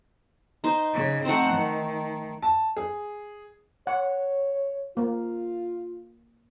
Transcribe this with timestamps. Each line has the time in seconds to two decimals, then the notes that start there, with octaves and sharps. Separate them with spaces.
0.64 D#4 C5
0.94 C#3
1.25 A3 C4 D#4 C5 F#5
1.54 D#3
2.42 A5
2.76 G#4
3.87 C#5 F#5
4.97 A#3 F4